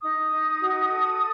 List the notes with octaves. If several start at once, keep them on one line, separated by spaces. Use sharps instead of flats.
D#4 D#6
D#4
F#4
A4